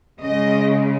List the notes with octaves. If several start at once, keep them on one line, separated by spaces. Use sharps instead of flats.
C#3 G#3 D#5